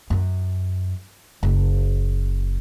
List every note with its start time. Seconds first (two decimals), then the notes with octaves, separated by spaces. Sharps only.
0.10 F#2
1.43 F#1